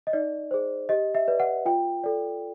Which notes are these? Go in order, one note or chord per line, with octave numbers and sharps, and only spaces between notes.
D#5
D#4 D5
G#4 C5
G4 D#5
E5
B4 D5
F#5
F4 G5
A4 D5